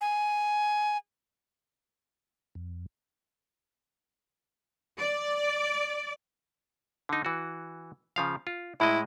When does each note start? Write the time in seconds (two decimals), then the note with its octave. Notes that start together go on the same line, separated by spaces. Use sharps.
0.01 G#5
2.55 F2
4.98 D5
7.09 D3 D#4
7.25 E3 F#4
8.16 C#3 F3 F5
8.47 F4
8.80 A2 G#3 E4 D#5